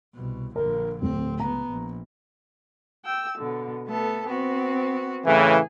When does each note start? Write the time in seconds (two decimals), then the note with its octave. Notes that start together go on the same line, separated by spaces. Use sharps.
0.13 C2 B2
0.56 A#1 D3 A#4
1.02 D1 C4
1.40 C#2 B3 A#5
1.69 A#1
3.04 G5 E6
3.38 B2 D3
3.87 A3 B3 A4
4.28 B3 C4 F#4
5.25 A2 C#3 E3 G#4